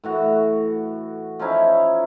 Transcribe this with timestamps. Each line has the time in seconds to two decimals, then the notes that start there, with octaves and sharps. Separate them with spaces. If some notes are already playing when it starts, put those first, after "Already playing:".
0.04 A2 E3 F#4
1.39 F3 C#4 D#4 E4